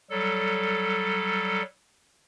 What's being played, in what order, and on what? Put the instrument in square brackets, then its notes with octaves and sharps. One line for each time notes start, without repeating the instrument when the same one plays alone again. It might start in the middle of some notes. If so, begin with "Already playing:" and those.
[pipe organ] F#3 G3 A4